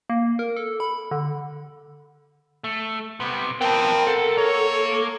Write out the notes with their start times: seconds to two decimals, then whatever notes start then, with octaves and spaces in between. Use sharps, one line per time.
0.10 A#3
0.39 A#4
0.56 A4
0.80 B5
1.11 D3
2.64 A3
3.20 C3 G3 B3
3.61 F3 B3 C4 A#4 G5 A5
4.07 B1 A4 F#5
4.38 A#3 C#5 A#5